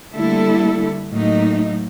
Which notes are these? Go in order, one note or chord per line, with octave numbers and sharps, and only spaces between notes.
D3 G3 A3 A#3 E4 A4
A2 F#3 A3 A#3 D#4